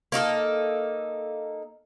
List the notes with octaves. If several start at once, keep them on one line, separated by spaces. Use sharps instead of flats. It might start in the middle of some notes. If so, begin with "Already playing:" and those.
A#3 D#4 F#4 A4